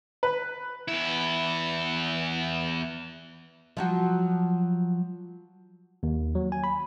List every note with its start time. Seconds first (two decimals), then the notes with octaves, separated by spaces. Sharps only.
0.23 B4
0.88 E2 E4
3.77 F3 F#3 F#4
6.03 D#2
6.35 F#3
6.52 G#5
6.64 B5